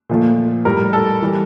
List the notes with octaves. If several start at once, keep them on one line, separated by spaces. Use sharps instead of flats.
A#2 F3 A3
A2 G3 A#4
A4
E3 G3